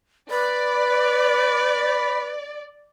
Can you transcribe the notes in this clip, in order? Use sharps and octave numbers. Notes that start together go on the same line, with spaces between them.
B4 D5 B5